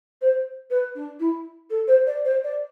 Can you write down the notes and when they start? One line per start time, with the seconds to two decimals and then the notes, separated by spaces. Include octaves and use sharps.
0.21 C5
0.70 B4
0.95 D4
1.19 E4
1.70 A4
1.87 C5
2.06 D5
2.24 C5
2.44 D5